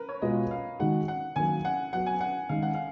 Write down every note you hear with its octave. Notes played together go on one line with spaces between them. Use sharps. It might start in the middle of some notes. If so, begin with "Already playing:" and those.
Already playing: A#4 B4
C#5
B2 G#3 B3 F4 D#5
F5
D#3 G#3 D#4 F#4 F#5
F#5
D#3 F#3 A#3 G#5
F#5
F#3 B3 F#4 F#5
G#5
F#5
D#3 G#3 D#4 F5
F#5
F5